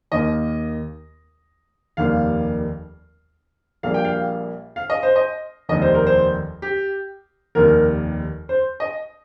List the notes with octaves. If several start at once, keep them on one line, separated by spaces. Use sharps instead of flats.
D#2 D#3 A#3 D#5
F1 D#2 D#3 G3 A#3 F5
A#1 A#2 G3 A#3 F5
G5
F5
F5
D#5
C5
D#5
F1 D#2 D#3 G3 D#5
C5
A#4
C5
G4
F1 D#2 D#3 G3 A#4
C5
D#5